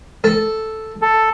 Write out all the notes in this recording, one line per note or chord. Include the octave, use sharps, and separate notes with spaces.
A4
A4